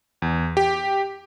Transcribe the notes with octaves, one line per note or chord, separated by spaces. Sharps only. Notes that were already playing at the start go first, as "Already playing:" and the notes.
E2
G4